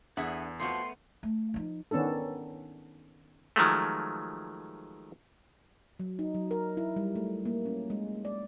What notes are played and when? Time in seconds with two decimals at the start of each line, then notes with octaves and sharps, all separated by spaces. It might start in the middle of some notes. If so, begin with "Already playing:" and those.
0.17 E2 D3 G#4 E5 F#5
0.60 F2 F3 A3 B3 F#4 C6
1.23 A3
1.54 F3 D#4
1.91 D#3 B3 C#4 D4 A4
3.56 D#3 F3 F#3 G#3 A3
6.00 F#3
6.19 D#4
6.35 F#3
6.51 A#4
6.77 E4
6.96 G3
7.16 A3
7.45 A#3
7.66 C#4
7.90 G#3
8.25 D5